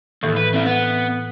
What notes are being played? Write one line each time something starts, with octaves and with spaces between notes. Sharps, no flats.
D#2 A2 E3
B4
C4 E4
B3 F#5